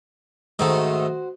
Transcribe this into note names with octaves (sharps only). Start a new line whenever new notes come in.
G#2 D#3 A3 F#4 C5